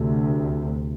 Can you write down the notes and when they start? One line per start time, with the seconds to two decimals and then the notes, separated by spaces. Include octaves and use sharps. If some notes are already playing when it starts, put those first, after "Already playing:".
Already playing: D2 C3